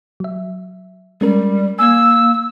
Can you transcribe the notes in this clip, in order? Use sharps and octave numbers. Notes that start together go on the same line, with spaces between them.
F#3 E5
G3 G#3 C#4 A#4
A#3 G#5 E6 G#6